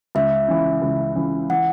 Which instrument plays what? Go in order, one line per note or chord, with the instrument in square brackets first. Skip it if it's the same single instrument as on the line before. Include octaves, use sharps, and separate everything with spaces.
[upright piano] C#2 [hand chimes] E5
[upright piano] C#3 E3
C#2
C#3 E3
[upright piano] E3 [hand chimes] F#5